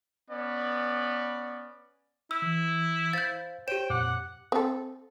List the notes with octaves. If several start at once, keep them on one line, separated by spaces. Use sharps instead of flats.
B3 C#4 D5
E4 E6
E3
C5 F5 G6 A6
G4 C5 C#5 G5 E7
F2 A#2 F#5 D6
C4 A4